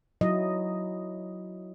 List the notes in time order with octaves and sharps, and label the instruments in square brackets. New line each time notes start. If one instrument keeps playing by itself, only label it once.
[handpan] F#3 E4 D#5